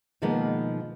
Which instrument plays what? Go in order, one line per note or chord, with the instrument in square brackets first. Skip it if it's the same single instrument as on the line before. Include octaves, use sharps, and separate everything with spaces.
[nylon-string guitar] B2 D#3 F3 G#3 A#3 B3